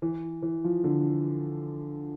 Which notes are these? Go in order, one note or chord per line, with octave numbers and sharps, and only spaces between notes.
E3
E3
F3
D3